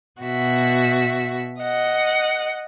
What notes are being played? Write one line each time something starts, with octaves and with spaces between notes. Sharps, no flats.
B2 F#4 E5
D#5 F#5